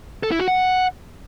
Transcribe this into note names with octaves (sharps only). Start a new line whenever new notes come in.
A4
E4
F#4
F#5